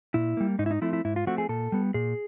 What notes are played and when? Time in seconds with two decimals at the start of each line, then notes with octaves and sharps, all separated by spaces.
0.14 A#2 E4
0.37 G3 A#3
0.59 G#2 D#4
0.66 E4
0.71 D#4
0.82 F3 A3 C4 E4
0.93 E4
1.05 G#2 E4
1.16 F4
1.27 F3 A3 C4 F#4
1.38 G#4
1.49 A#2 A4
1.72 G3 B3
1.94 A#2 G#4